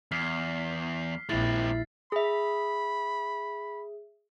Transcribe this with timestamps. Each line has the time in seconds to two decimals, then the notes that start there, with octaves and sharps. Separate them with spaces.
0.12 E2 F6 B6 C7
1.29 A#1 G#3 C4 E4 A6 C7
2.12 G#4 E5 B5